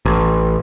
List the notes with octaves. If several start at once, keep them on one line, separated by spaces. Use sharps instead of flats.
A1